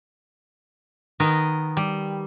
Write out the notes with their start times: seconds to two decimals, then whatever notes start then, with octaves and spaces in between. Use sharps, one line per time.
1.20 D#3 B3 A#4 D#5
1.77 G3